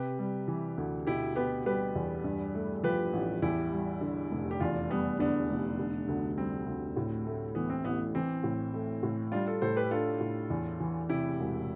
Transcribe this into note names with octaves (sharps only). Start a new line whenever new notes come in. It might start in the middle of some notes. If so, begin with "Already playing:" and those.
Already playing: C3 G4 B4
G3
E3
D2
B2 E4 G4
B3 G4 B4
G3 G4 B4
E2
G2
A3
F3 G4 B4
A1
E2 E4 G4
G3
D3
F1
G4
E2 D4 F4
G3 B3 D4
D3 B3 D4
F1
D3
D2
G3 C4
D2
A2
A3
E3 B3
C4
A1 B3
E3 C4
A2
A3
A2
G3 D4 F4
F4 A4
A2 A4 C5
G4 B4
D4 F4 A4
A2
E2
E3
C3 E4 G4
E1